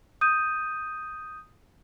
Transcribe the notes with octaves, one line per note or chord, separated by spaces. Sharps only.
D#6 G6 D#7